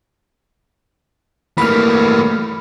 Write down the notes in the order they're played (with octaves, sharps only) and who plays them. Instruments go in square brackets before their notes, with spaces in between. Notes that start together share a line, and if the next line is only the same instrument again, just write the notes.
[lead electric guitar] E3 A#3 [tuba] A3 [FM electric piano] B5 F6